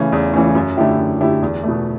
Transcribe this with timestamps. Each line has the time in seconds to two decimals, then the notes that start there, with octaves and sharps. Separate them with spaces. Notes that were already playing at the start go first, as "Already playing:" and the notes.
Already playing: C#3 E3 A3 C#4
0.12 E2
0.34 C#3 E3 A3 C#4
0.55 F#2
0.77 D3 A3 E4 G4
0.98 F#2
1.21 D3 A3 E4 G4
1.42 E2
1.64 B2 A3